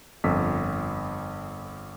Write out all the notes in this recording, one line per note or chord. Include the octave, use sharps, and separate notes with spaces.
G1 F2 E6 B6